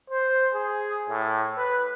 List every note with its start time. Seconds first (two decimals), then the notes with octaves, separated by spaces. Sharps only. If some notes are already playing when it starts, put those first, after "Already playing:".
0.10 C5
0.54 G#4
1.09 A2
1.58 B4